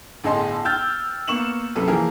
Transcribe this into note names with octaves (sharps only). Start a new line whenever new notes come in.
G1 A2 G#4 D#5 A5 C6
G5 E6 F6 G6 A6
A#3 B3 C#6 E7 F#7
C2 F#2 A4 B4
E3 F3 A#3 G#4 A#4